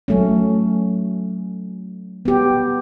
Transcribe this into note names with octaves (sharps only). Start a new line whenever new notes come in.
F#3 A3 C#4
B3 G4